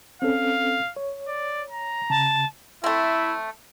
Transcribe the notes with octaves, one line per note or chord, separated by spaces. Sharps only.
C4 C#4 A4 F5
C#5
D5
A#5
C#3 A5
A3 C4 E4